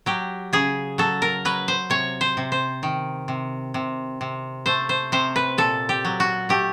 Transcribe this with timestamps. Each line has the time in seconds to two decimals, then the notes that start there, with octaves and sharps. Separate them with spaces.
0.06 F#3 G4
0.53 C#3 G#4
0.98 F#3 A4
1.22 A#4
1.45 F#3 B4
1.68 C5
1.90 C3 C#5
2.21 C5
2.37 C3
2.52 C5
2.83 D#3
3.28 C3
3.74 C3
4.21 C3
4.66 A3 C5
4.89 C5
5.12 C3 C5
5.36 B4
5.58 A#2 A4
5.89 G4
6.05 F#3
6.20 F#4
6.49 A3 G4